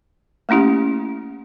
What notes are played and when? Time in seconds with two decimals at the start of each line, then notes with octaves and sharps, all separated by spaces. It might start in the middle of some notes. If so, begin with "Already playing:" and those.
0.49 A3 A#3 C#4 E4 G4